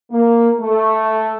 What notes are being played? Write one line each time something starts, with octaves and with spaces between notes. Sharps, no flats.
A#3
A3